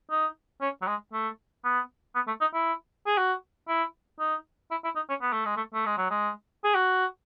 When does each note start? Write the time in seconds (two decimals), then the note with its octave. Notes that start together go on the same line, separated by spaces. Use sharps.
0.11 D#4
0.61 C#4
0.82 F#3
0.87 G#3
1.13 A3
1.64 B3
2.15 B3
2.27 A3
2.41 D#4
2.54 E4
3.06 G#4
3.18 F#4
3.68 E4
4.20 D#4
4.71 E4
4.84 E4
4.96 D#4
5.09 C#4
5.22 B3
5.33 A3
5.45 G#3
5.57 A3
5.74 A3
5.86 G#3
5.98 F#3
6.10 G#3
6.64 G#4
6.75 F#4